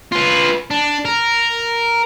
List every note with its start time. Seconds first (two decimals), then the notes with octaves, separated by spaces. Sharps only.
0.12 F4 B4
0.70 D4
1.05 A#4